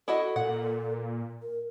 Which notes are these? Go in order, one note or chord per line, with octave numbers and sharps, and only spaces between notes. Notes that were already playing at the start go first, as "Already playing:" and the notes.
E4 F#4 A4 D#5
A#2 F#5
A#4